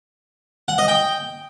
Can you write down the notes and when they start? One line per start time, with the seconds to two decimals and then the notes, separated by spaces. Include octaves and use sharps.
0.68 F#5
0.78 D#5
0.88 G5